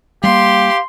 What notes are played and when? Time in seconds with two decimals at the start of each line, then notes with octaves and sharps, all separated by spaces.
0.23 G3 G#3 A#3 G4 F5 C6